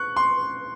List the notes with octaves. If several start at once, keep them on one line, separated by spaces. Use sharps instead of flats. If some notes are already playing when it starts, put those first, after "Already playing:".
Already playing: C#6 F#6
C6